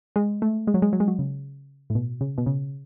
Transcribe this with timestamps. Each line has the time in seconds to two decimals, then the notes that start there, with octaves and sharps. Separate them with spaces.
0.16 G#3
0.42 A3
0.67 G#3
0.74 F#3
0.82 G#3
0.93 F#3
1.00 G#3
1.08 F#3
1.19 C#3
1.90 A2
1.95 B2
2.21 C#3
2.38 B2
2.46 C#3